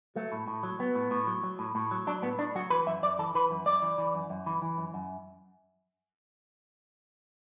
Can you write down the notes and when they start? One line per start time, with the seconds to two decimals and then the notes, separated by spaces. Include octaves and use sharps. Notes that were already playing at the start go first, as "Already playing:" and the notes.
0.16 F#3 A3
0.32 A2
0.48 A2
0.63 F#3
0.79 F#3 B3
0.95 A2
1.11 A2
1.27 F#3
1.43 F#3
1.59 A2
1.75 A2
1.91 F#3
2.07 F#3 D4
2.22 A2 B3
2.38 A2 D4
2.55 F#3 F#4
2.70 E3 B4
2.87 F#2 E5
3.03 F#2 D5
3.18 E3 A4
3.34 E3 B4
3.51 F#2
3.66 F#2 D5
3.82 E3
3.98 E3
4.14 F#2
4.30 F#2
4.46 E3
4.62 E3
4.78 F#2
4.94 F#2